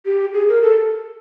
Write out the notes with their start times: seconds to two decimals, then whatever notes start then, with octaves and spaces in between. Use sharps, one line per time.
0.06 G4
0.34 G#4
0.49 A#4
0.62 A4